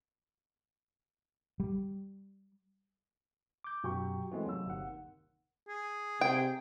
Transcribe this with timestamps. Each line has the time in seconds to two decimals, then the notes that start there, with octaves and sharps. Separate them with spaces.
1.60 G3
3.64 D6 G6
3.84 F#2 B2 F#3 G4 C#6
4.32 E3 G#3 A3 C4 F#4
4.45 D#2 C3 F#3 E6
4.66 G1 F#5
5.68 G#4
6.21 C3 G5